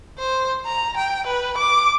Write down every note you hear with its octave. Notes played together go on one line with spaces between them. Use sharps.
C5
A#5
G5
B4
D6